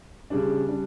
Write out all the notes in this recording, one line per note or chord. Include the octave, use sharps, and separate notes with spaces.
C#3 G3 D4
G3 D4